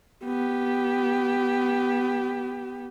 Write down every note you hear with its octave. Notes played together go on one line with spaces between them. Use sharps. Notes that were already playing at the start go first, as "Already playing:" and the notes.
B3 G4